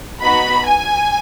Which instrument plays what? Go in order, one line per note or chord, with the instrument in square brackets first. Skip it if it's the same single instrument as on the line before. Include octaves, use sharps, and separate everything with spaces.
[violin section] B3 D#4 F#4 B5
G#5